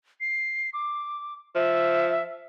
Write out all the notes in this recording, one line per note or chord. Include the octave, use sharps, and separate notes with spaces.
C7
D6
F3 E5